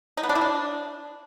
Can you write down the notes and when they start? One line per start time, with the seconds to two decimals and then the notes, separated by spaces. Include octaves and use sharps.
0.17 D#4
0.23 B3
0.29 D4
0.35 E4
0.41 D4